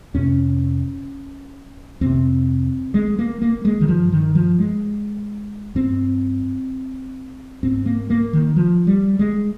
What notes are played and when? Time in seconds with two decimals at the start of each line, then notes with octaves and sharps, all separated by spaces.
0.14 F2 C3 C#4
2.01 F2 C3 C4
2.94 G#3
3.19 A#3
3.42 A#3
3.65 G#3
3.81 D#3
3.88 G2 F3
4.12 D#3
4.35 F3
4.59 G#3
5.75 G2 C4
7.63 G#2 C4
7.86 A#3
8.10 A#3
8.33 D#3
8.56 F3
8.87 G3
9.19 G#3